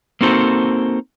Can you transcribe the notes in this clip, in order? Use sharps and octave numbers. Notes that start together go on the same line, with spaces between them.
A#3 C4 D#4 F#4 A4 C5